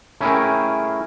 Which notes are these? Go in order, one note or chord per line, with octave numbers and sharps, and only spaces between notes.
A3 C#4 E4 G#4 A#4 G5